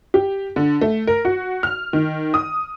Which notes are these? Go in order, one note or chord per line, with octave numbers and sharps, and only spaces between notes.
G4
D3
A3
A#4
F#4
F6
D#3
D#6